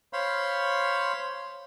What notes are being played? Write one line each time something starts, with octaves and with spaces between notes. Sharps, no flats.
C5 C#5 F5 B5 C6